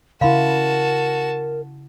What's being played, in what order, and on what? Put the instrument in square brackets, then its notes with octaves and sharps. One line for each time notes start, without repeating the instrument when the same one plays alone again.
[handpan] C#3 E4 [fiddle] F#4 A5 [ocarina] A#4 [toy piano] F5 B5 C6